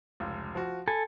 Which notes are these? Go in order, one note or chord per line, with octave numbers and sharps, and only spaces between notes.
F1 C#2
F3 F#4
A4 G#5 B5